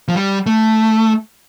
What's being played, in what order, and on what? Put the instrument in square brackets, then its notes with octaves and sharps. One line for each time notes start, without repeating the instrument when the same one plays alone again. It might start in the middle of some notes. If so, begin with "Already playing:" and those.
[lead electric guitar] F3
G3
A3